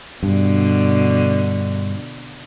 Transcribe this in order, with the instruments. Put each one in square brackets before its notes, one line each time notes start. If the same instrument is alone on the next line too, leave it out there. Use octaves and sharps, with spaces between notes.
[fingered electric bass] G2 [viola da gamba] B2 D3